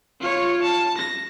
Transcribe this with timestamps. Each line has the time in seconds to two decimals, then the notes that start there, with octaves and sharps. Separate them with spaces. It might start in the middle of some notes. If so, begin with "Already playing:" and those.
0.20 F4 C#5
0.62 A5
0.98 A#6